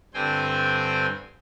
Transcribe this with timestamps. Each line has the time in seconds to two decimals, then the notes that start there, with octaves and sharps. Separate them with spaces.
0.14 G2 D3 C4 C5 G5 G#5